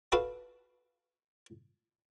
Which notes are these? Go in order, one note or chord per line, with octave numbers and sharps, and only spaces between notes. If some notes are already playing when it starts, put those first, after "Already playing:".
F#4 A4 B4 F5